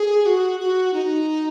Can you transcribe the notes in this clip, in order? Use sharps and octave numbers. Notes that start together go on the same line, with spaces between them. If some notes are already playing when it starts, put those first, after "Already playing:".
Already playing: G#4
F#4
F#4
D#4